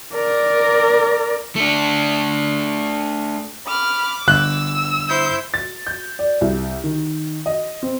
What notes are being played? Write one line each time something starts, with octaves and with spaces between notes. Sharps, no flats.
A#4 D5
A3 D4
B5 D6 F6
G1 E6 F#6
E4 C5 G6
A6
G6
D5
C2
D#3
D#5
C4